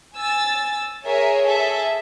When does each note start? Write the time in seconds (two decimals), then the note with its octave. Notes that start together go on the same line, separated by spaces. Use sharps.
0.15 G#5 E6 A6
1.04 G#4 A#4 C#5 E5
1.45 G#4 A4 E5